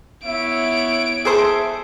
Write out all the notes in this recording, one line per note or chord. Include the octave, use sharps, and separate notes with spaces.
B3 E4 C#5 E5 D7
G#4 A4 C5 E5